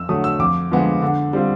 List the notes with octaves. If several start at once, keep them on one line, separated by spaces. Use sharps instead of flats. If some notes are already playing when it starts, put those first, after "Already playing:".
Already playing: F2 E6
D3 F#3 A3 D#6
E6
F2 D6
D3 F3 G#3 B3
D3
G3 C4 F4